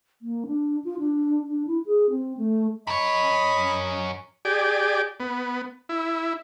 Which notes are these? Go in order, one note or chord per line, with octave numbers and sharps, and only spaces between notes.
A#3
D4
F4
D4
D4
E4
G#4
C4
A3
F#2 C#5 D#5 B5
G4 G#4 D5
B3
E4